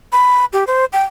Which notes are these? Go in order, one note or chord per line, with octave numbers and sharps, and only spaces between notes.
B5
G4
C5
G5